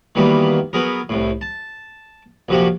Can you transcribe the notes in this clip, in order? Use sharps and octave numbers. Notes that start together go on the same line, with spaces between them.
D#3 E3 F#3 G3 A#3 B3
F#3 B3 G#4 A#4
C2 A2
A5
A#1 F#2 C3 F3 F#4 G4